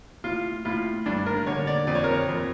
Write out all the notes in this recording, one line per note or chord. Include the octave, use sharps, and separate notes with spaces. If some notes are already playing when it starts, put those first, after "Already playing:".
A2 F4
A2 F4
G2 D4
A#4
D3 C#5
D5
F2 D5
C#5
A#4
C#5
F2